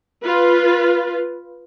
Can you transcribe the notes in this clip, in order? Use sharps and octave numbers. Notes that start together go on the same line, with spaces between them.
F4 B4